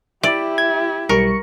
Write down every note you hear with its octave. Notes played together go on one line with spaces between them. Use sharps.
E4 G4 D5 E5
G#6
B1 G3 A#4 C#6 C#7